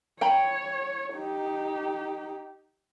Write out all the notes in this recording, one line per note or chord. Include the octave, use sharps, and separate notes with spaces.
C#5 G5 A#5 B5
D#4 G4